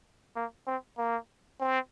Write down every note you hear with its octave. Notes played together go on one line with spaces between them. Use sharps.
A#3
C4
A#3
C4